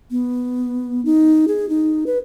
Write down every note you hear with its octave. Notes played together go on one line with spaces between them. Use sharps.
B3
D#4
G#4
D#4
B4